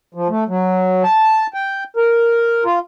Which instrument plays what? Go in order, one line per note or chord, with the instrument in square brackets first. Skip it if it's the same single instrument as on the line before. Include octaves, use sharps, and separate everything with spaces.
[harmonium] F3
A3
F#3
A5
G5
A#4
F4